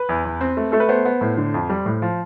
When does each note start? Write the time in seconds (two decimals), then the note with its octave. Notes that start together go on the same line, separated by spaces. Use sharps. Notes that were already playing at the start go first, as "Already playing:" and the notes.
Already playing: B4
0.09 E2
0.25 E2
0.41 C4
0.57 A3
0.72 A3 A4
0.80 B4
0.89 B3 C5
1.05 B3
1.21 A2
1.37 D3
1.54 F2
1.70 G3
1.86 A2
2.02 F3